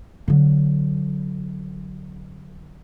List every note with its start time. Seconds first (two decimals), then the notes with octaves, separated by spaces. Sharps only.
0.28 D3 F#3